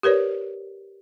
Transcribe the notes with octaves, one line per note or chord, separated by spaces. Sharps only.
G4 A#4 B4 C#5 D5